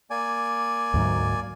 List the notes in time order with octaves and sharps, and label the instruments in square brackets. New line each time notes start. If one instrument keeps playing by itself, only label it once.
[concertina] A#3 D5 G#5
[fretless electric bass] D2 G#2 F#3